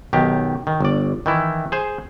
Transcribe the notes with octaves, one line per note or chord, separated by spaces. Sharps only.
B1 D#3 G4
D#3
G1 D5
D#3 E3 E4
G#4 C5